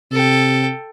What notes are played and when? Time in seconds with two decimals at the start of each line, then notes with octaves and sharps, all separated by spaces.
0.12 C3 A4 G5